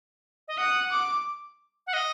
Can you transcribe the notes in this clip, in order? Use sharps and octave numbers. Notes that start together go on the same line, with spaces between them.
D#5
F#5 D#6
D6
F#5
D#5